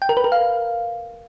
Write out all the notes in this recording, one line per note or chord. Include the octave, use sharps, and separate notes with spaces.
G5
A#4
B4
A#4
F5